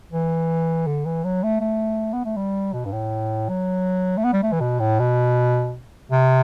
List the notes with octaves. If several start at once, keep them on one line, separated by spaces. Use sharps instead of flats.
E3
D3
E3
F#3
A3
A3
B3
A3
G3
B2
G2
A2
F#3
A3
B3
G3
A3
E3
B2
A2
B2
C3